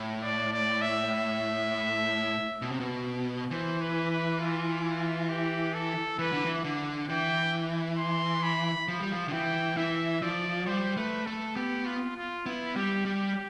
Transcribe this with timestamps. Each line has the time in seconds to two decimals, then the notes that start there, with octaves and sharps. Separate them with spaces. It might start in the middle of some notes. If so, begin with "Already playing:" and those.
Already playing: A2
0.23 D5
0.53 D5
0.82 E5
2.62 B2
2.71 C3
2.80 B2
3.51 E3 C5
3.81 B4
4.11 B4
4.40 F4
4.85 F4
5.29 G4
5.74 A4
6.19 E3 B4
6.32 D3
6.45 E3
6.64 D3
7.09 E3 G5
7.98 C6
8.43 B5
8.88 F3
9.00 G3
9.12 F3
9.28 D3
9.33 E3 G5
9.77 E3 E5
10.22 F3 D5
10.66 G3 C5
10.97 A3 B4
11.26 A3 A4
11.56 B3 G4
11.86 F4
12.17 F4
12.46 B3 E4
12.76 G3 G4
13.06 G3 G4